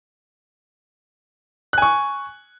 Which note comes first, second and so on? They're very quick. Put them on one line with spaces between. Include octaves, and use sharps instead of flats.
F#6 G#5 C#6